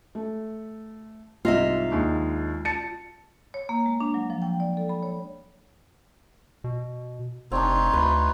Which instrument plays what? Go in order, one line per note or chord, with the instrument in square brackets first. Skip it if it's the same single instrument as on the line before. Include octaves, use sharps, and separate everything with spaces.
[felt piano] A3
[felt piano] C2 G#2 [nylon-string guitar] F4 D#5 E5
[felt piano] D#2 G#3 D4
A5 A6 C#7
[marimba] C#5
A#3
G#3
D4
F#3
F3
G5
D5
A4
B5
C#5
[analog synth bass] B2
[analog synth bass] F1 [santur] C4 D4 [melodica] D#4 F4 C#5
[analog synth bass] D2 [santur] B4